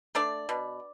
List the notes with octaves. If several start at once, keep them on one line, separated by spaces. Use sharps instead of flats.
A3 D4 D5
B2